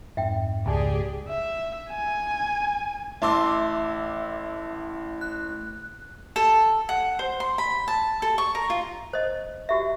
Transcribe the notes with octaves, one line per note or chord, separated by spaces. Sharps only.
F2 G#2 E5 G5
C#2 G4 G#4 D5 G#5 A5
E5
G#5
A1 E5 A5 C6 D6 E6
F#6
A4
F#5
C5
C6
B5
A5
A4
C#6
A#4
F4
C5 D#5
F#4 G4 E5